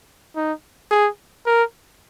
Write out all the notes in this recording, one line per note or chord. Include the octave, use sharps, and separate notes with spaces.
D#4
G#4
A#4